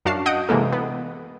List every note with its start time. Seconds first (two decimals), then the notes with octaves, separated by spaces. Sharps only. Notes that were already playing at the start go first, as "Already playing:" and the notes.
0.05 F#2 D4 F#4 F5 A5 C7
0.26 D#5 F#5 D#6 G6 D7
0.49 C3 E3 G#3 A#3 A4
0.72 B3